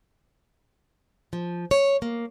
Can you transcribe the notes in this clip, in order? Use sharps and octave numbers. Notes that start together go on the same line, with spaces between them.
F3
C#5
A#3